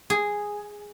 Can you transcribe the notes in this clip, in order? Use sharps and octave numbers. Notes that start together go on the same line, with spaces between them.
G#4